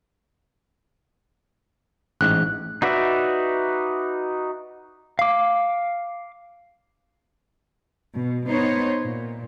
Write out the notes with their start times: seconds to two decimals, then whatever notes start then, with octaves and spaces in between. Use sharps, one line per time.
2.21 A1 G#2 F#6
2.82 D#4 F#4 B4 D5 E5
5.19 F5 D6
8.14 B2
8.49 B3 D#4 C5 C#5
9.03 A#2